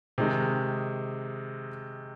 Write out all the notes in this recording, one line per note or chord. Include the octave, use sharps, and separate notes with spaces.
C3 D#3 G#3 D#4